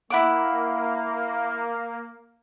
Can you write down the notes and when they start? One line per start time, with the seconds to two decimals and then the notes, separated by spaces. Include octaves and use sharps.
0.10 A#3 E4 F#5 D6